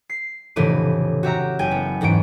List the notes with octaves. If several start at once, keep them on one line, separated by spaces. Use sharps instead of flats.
C7
F1 A2 C#3 E3 D5 D#7
F#4 G4 E5 A#5
F#1 G5 G#5
B3
E2 G#2 E3 C#4 D7